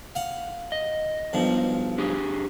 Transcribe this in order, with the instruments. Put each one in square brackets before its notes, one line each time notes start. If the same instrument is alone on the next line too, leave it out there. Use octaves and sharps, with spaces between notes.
[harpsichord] F5 F#5
[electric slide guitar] D#5
[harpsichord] B1 G2 F3
[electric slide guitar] D4 G4 G#4